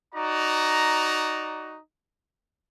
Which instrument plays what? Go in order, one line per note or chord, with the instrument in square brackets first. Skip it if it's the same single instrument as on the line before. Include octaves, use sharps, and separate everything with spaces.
[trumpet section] D#4 F#4 D5 A#5